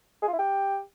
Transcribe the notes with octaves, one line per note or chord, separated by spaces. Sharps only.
G#4
F4
E4
G4